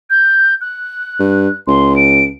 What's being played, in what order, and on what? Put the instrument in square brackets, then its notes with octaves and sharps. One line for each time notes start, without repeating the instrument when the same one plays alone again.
[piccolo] G6
F#6
[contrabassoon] G2
[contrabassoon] C#2 [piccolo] C6
[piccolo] D7